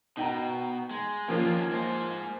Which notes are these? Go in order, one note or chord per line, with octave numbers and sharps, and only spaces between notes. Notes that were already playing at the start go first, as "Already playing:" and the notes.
B2 D#4 G5 A#5
G#3
D#3 F3 A#3 C#4 F4
G#3 C5